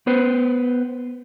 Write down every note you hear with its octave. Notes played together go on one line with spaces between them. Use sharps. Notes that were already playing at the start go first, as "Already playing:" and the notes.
B3 B4 C5